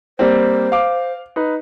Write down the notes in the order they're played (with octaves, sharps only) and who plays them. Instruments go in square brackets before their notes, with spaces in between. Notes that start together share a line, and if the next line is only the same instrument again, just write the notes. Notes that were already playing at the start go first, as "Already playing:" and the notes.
[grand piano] G3 A#3 C4 [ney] C5
[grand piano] F5 D6
D#4 B4